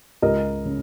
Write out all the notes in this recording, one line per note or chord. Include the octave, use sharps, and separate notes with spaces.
C#2 A#4 D#5
C#3